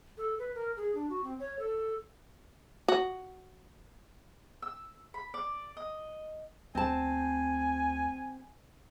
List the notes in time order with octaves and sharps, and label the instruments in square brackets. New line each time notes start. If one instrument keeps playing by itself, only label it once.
[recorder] A4
B4
A#4
G#4
D4
F#4
C4
C#5
A4
[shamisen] F#4
[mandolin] E6
B5
D5
D#5
[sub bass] D2 [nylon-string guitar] C4 A5 [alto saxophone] G#5